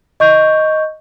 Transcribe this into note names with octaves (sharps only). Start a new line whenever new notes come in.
D#5 C#6 G6